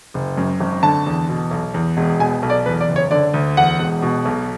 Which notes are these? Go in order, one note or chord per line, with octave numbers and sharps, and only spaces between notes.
F#1
F#2
G#1
D3 A5
E2
B2
B1
E2
E1
B2 G#5
B1
D5
E2 B4
D5
F#1
C#5
D3 D5
D2
E2 F#5
E1
B2
B1